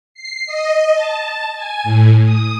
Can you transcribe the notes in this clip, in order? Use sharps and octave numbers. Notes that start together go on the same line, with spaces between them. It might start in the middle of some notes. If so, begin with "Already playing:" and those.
C7
D#5
A5
G#5
A2
D#6